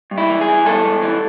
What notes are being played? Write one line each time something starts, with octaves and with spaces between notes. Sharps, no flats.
G2
E4
E3
G#4
E3
G2 A4
G2
E3